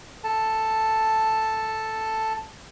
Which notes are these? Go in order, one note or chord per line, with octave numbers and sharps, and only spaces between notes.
A4 A5